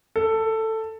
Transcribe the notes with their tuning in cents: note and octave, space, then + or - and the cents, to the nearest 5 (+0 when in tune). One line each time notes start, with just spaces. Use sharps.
A4 +10